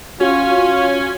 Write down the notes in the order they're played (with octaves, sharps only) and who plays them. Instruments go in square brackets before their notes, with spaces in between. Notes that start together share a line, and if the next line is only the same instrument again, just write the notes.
[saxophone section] C#4 [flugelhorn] F4 [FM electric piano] F#4